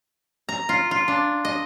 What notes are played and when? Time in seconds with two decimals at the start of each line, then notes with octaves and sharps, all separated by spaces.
0.49 A#5
0.69 F4
0.91 F4
1.08 D4
1.45 D#5